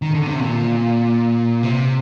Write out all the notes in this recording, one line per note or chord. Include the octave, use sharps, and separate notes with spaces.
D#3
D3
C3
A#2
C3